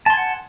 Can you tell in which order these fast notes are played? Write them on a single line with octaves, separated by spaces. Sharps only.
A5 C6 G#5 F#5